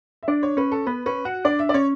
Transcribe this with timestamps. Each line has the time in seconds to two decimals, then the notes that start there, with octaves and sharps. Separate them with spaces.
0.23 E5
0.28 D4 D5
0.43 C#5
0.57 C#4 B4
0.72 A4
0.86 B3 B4
1.06 C#4 B4
1.25 F#4 F#5
1.45 D4 D5
1.59 E5
1.69 D5
1.74 C#4 C#5